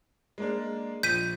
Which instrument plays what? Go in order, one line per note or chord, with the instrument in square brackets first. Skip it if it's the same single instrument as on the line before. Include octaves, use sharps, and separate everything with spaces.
[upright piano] G#3 A#3 D4
[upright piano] A#1 [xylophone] G6 B6 D#7